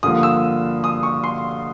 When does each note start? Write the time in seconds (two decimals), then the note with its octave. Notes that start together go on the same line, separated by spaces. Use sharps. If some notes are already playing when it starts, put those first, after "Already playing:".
0.03 G2 D3 F3 A#3 D#6
0.23 E6
0.84 D#6
1.03 C#6
1.24 C6